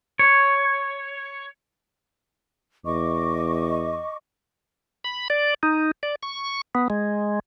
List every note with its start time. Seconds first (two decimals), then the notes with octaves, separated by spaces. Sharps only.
0.19 C#5
2.85 E2 D#5 C#6 D6
5.04 B5
5.30 D5
5.63 D#4
6.03 D5
6.23 C#6
6.75 B3
6.90 G#3